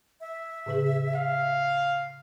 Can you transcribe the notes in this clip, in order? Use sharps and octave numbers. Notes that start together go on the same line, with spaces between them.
E5
A2 C#3 G#4
F5